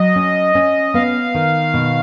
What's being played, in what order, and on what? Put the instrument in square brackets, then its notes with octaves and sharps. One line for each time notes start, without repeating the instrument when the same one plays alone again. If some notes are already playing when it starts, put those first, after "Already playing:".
Already playing: [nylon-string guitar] F#3 [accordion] D#5
[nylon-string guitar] C#4
C#4
[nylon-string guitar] B3 [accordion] F5
[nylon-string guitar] D#3
B2